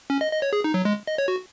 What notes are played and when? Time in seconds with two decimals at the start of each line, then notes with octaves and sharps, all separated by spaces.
0.10 C#4
0.21 D#5
0.32 D#5
0.42 C#5
0.53 G#4
0.64 D#4
0.74 F#3
0.85 G#3
1.07 D#5
1.18 C#5
1.28 F#4